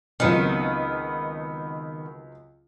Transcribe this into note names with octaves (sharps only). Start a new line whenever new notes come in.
C#2 D#3 F#3 B3 C4